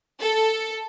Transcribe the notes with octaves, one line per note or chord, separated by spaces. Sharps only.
A4